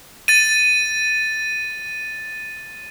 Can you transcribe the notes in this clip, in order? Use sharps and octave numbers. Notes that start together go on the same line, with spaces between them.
A6 D#7